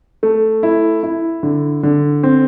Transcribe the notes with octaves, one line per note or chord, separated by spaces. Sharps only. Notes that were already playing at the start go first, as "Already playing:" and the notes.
A3
E4
E4
D3
D3
C4